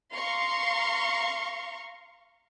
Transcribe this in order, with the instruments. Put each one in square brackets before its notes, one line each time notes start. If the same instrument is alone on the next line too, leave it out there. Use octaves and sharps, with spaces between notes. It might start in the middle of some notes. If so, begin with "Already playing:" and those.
[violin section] F5 A#5 C6 C#6